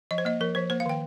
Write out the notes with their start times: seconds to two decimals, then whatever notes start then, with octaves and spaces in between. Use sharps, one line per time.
0.11 F3 D#5
0.18 C5
0.25 A#3 D#5
0.40 F3 A#4
0.55 F3 C5
0.70 A#3 C5
0.80 F5
0.86 D#3 G5